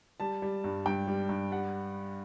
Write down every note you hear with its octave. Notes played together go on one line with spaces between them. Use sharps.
G3 A5
G3
G2
G2 G5
G3
G2
G3 F#5